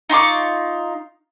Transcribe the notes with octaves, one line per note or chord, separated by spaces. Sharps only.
D#4 F4 C#6 D6